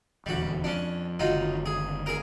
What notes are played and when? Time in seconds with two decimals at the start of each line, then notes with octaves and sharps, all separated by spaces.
0.26 D#1 E2 D3 G3 F#4
0.64 F2 C#4 D4
1.19 F#1 D3 D#3 F#3 D#4 F4
1.66 G#4
2.06 G#4 A#4